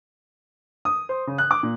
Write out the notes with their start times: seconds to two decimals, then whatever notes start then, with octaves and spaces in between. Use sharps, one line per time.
0.85 D#6
1.09 C5
1.27 C#3
1.38 F#6
1.51 D6
1.63 A#2